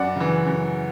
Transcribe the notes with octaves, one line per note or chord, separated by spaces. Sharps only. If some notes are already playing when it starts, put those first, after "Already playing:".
Already playing: F#2 D5 F#5
C#3 E3
F#2